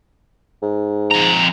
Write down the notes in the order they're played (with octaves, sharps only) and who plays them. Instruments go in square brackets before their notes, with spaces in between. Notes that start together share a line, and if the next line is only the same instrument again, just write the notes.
[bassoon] G#2
[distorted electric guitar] F2 A#5